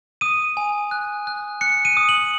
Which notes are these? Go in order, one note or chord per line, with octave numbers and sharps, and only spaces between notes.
D#6 D#7
G#5
F#6
F#6
F#6 C#7
D#7
D#6
F#7